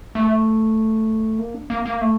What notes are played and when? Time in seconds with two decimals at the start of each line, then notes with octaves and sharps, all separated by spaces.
0.15 A3
1.39 A#3
1.54 D4
1.70 A#3
1.86 A#3
2.01 A3